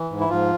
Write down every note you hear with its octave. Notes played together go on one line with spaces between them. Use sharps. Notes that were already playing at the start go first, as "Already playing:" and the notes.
Already playing: E3
G#2
E4
G#2 F3 F4